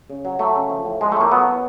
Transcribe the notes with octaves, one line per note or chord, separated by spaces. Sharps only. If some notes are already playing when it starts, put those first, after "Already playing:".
C#3
F#3
F#3 A3
C#3
F3
A2
F3 G#3
A3
A2 A#3
F#3 B3
F#3